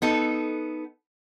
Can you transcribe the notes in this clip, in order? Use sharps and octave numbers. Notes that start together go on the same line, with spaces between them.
B3 D#4 A4